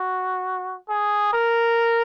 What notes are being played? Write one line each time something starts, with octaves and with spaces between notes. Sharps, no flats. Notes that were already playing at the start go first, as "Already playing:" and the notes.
Already playing: F#4
G#4
A#4